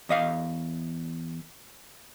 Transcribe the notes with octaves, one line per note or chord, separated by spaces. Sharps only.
E2 D#5 F5